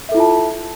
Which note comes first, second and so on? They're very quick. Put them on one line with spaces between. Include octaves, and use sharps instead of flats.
E5 A4 E4 F4 A5